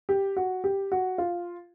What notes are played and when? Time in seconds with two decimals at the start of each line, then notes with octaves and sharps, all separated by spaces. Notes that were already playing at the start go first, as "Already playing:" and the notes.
0.09 G4
0.37 F#4
0.64 G4
0.92 F#4
1.18 F4